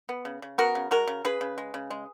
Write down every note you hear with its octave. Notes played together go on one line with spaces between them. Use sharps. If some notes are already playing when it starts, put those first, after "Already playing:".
B3
C#3
C#3
B3 F#4 A#4
C#3
G#3 F#4 A#4
C#3
C#3 G#4 B4
C#3
G#3
C#3
G#3